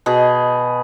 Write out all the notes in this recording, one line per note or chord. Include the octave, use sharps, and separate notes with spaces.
B2 G#4